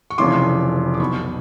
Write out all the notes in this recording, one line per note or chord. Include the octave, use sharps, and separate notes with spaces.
C#6
F1 F2 C#3 E3 C6 D6
D6
B1 B2 B5 C#6